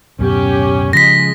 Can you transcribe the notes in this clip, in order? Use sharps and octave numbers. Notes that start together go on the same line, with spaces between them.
D1 F#2 B2 C#4 G4
C#3 F3 G#3 A#6 B6